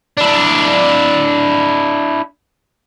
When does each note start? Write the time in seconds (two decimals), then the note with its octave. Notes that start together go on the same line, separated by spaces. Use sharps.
0.17 D4 E4